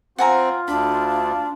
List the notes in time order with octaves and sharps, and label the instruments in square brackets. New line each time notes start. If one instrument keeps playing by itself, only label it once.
[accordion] C4 [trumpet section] F4 [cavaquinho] F#5 G#5 A#5
[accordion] D2 [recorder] D4 [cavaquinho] B5